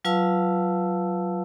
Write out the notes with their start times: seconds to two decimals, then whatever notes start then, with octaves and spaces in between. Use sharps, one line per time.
0.05 F#3 F4 B4 F5 A5 E6